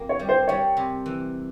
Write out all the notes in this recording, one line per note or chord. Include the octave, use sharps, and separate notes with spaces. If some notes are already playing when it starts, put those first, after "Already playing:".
Already playing: F2 A#3
C#5
G3
C5
G3 C#5
C3
E3